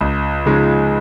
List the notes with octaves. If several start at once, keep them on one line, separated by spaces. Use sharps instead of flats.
C#2
C#3 F3 G#3 D#4